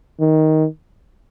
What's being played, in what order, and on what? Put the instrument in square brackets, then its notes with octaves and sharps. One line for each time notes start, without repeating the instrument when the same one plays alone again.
[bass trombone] D#3